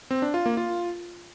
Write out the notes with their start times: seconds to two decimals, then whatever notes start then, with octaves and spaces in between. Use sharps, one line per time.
0.11 C4
0.22 D4
0.34 F4
0.46 A#3
0.57 F4